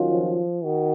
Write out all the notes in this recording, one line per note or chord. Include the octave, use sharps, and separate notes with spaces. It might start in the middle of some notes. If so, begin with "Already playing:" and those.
Already playing: D#3 F#3 C#4 F4
F3
D#3 F#4